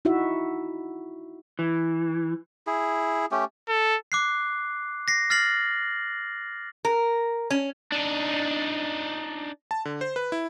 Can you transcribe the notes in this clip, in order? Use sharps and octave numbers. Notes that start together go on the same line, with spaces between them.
D#4 E4 F#4 E5
E3
E4 G#4
A3 C#4 G4
A4
D6 F#6 C7
A#6 C7
F6 A6 A#6 C7 F#7
A#4
C#4
D4 D#4
A5
D3
C5
B4
E4